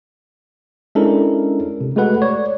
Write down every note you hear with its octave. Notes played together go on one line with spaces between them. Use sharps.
G#3 C#4 D4 E4 A4 A#4
C3
G#3 A3 F#4 A4 B4 F#5
C#5 D5